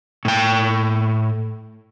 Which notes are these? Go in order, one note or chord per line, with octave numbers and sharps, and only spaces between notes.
A2 G5